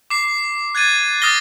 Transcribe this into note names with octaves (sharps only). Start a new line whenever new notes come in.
D6 C7
F#6 G#6 A6 D#7
D#6 F6 A6 A#6 G7